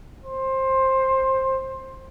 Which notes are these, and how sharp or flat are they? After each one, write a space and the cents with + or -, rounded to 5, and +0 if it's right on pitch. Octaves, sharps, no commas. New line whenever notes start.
C5 +15